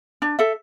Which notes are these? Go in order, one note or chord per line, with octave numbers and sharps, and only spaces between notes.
D4
A4 E5